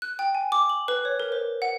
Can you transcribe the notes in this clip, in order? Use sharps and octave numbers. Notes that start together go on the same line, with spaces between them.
F#6
G5
G#5
D6
F#7
B4
C#5
A#4
C5
F#5